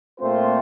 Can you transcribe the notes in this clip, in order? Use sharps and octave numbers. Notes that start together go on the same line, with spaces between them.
A#2 A3 C4 F4 C5